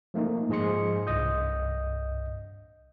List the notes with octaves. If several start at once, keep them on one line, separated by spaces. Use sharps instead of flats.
F3 A3 A#3 D#4
G#2 F3 G#4 D#5 C6 C#7
C2 G2 D#5 D#6 G6